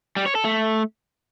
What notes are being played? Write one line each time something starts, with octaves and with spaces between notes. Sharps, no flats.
G3
C#5
A4
A3